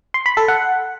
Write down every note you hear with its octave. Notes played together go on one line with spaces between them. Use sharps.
C6
B5
A4
F#5